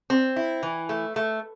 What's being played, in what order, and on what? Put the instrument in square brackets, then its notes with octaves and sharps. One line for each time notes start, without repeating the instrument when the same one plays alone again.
[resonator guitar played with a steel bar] C4
E4
E3
A3
A3